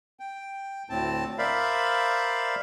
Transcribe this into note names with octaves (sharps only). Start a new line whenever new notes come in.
G5
D2 A2 C4 A5
A#4 C5 D5 E5 F5 B5